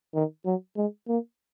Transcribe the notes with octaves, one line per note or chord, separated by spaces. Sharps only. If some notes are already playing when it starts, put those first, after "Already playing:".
D#3
F#3
G#3
A#3